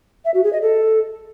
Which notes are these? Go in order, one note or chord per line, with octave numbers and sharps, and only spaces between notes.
E5
F#4
G#4
D#5
A4